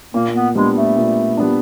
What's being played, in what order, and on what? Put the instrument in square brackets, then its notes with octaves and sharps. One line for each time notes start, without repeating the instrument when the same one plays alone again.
[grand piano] A#2 [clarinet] A#3
[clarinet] B3
[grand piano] G3 B3 D4 [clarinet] G#3
[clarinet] A3
[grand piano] A#2
G3 B3 D4